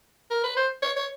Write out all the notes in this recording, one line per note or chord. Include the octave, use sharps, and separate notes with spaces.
A#4
B4
C5
C#5
C#5